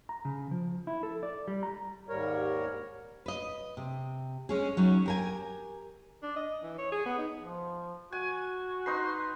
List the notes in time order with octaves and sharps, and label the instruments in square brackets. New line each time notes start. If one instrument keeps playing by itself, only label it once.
[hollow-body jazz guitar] A#5
C#3
F3
E4
A4
D5
G3
A#5
[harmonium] D#2 G#2 G3 A#4 C#5
[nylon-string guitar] B4 D#5
C3
G#3 C#4 G#4
F#3 C#4 D#4
G4 A#4 G#5
[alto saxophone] D4
D#5
E3
C#5
G#4
B3
D#4
[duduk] F3
[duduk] F#4 [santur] G#5
[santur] D#4 B4 C6